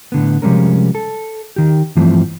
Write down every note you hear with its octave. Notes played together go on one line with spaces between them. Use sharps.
A2 D3 B3
C3 F3 G3 G#3 C#4 A#4
A4
D#3 G4
G2 E3 F3 A3 C4